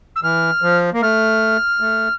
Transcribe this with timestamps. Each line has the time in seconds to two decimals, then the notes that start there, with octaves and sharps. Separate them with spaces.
0.15 E6
0.22 E3 F6
0.62 F3
0.94 A#3
1.01 A3 F6
1.81 A3